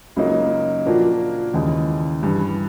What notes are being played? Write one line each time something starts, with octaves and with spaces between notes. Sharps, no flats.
C#2 C#3 F#3 A#3 D#4
A#2 F3 A#3 D4 F#4
D#2 C#3 E3 G#3
G2 E3 G3